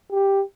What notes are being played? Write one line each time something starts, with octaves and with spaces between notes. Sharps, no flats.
G4